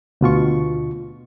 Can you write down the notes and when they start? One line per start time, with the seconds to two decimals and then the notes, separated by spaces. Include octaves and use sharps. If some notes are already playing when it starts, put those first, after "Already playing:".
0.21 D2 B2 F4 C#6